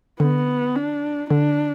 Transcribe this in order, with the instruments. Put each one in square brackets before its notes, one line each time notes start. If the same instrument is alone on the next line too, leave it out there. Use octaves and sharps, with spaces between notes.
[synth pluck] D3 [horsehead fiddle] B3
[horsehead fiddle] D4
[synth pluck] D3 [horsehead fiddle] D4